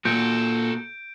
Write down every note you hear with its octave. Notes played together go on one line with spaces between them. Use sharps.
A#2 F#4 A4 G6 D7